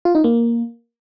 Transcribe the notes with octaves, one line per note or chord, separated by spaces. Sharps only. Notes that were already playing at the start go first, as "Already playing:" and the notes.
F4
D#4
A#3